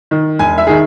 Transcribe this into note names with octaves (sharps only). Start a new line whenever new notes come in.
D#3
E1 G#5
E5
D#3 G#4